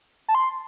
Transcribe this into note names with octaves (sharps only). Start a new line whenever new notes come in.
A5
C6